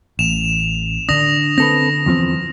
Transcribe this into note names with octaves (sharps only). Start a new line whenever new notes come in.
A1 E7 F7
D3 D4 D#6 A#6 F7
C4 A4 B4 A#6
E2 F3 C4